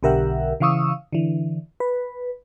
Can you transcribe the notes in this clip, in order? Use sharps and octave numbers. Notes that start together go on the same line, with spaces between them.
B1 D3 G4 A#4 E5 F#5
C#3 E3 F5 C#6 D#6 E6
D3 E3
B4